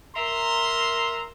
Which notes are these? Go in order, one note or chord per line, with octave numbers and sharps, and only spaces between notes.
A#4 E5 A#5 C6